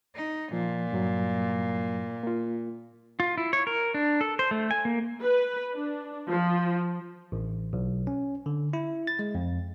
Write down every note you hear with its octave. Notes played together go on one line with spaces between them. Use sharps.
D#4
A#2 F3
G2 F#3
A#3 F4
F4
E4
C#5
A#4
D4
A4
C5
A3
G#5
A#3
B4
D4
F3
A1
B1
C#4
D3
E4
A6
G#3
F2